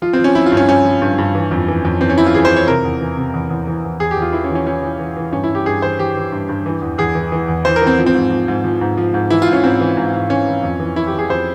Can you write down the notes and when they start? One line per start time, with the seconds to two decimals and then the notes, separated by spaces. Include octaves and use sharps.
0.02 F3 F4
0.13 C4
0.19 F3
0.24 C#4
0.35 F3 E4
0.46 F4
0.52 G2
0.57 C#4
0.68 G2 C#4
0.85 F3
1.02 G2
1.18 G2
1.35 E3
1.51 F2
1.68 E3
1.85 F2
2.01 E3 C4
2.10 C#4
2.18 E3 E4
2.26 F4
2.34 E3 G#4
2.45 C5
2.51 E3
2.56 C#5
2.67 C3 A#4
2.85 E2
3.01 E3
3.17 C3
3.34 E2
3.51 E2
3.67 E3
3.84 E2
4.00 E2 G#4
4.11 G4
4.17 E2
4.22 F4
4.33 E3 E4
4.44 C#4
4.50 E3
4.55 C#4
4.67 E3 C#4
4.83 E3
5.00 E3
5.16 E3
5.32 G2 C#4
5.44 E4
5.49 G2
5.55 G4
5.66 G2 G#4
5.82 E3 C5
5.99 E3 G4
6.16 E3
6.32 G2
6.49 G2
6.66 E3
6.82 E2
6.98 E2 G#4
7.15 E3
7.32 E3
7.48 E2
7.65 E3 C5
7.76 A#4
7.82 E3
7.87 C4
7.98 F3
8.06 C4
8.14 G#2
8.31 F3
8.48 G#2
8.64 F3
8.81 G#2
8.97 F3
9.14 G#2
9.30 E3 E4
9.42 F4
9.47 G#2
9.53 C#4
9.64 G#2 C4
9.81 E3
9.97 G#2
10.13 G#2
10.30 E3 C#4
10.47 E3
10.63 F2
10.80 E3
10.96 E3 E4
11.07 G4
11.13 E3
11.19 G#4
11.29 F2 C5